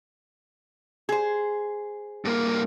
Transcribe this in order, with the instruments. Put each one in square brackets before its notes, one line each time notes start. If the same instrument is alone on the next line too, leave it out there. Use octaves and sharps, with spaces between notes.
[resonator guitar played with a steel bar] G#4 C5
[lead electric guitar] G2 A#3